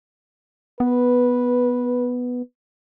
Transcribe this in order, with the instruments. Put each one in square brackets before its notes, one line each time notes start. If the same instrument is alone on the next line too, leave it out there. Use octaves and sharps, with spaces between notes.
[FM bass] B3 [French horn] B4